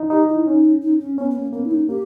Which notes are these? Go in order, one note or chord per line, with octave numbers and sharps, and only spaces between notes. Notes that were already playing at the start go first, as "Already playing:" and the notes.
Already playing: D#4
D#4 G4
E4
C#4 D#4
D#4
C#4
B3 C#4
B3
A#3
A#3 B3
E4
D#4
A#3 G4